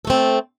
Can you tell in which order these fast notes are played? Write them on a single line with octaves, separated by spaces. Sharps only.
A4 A3 C4